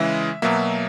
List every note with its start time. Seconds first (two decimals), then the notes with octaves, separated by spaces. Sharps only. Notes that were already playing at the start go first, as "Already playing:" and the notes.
Already playing: C#3 E3 G#3 E5
0.42 B2 F#3 A#3 E5